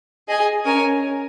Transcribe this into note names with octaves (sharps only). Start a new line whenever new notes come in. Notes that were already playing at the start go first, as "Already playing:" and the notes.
G#4 D#5 G#5
C#4 A#4 C#5 G#5